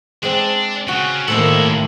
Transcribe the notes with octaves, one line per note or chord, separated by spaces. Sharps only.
G#3 C4 D4
C#3 F#4
A2 D#3 G#3 A#3 E4 A4 C5 E5